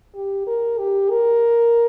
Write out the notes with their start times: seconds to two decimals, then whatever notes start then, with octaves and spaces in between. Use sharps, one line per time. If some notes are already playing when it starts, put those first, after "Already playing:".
0.15 G4
0.47 A#4
0.78 G4
1.10 A#4